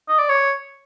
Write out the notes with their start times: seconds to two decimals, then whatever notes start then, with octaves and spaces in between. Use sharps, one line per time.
0.08 D#5
0.19 D5
0.29 C#5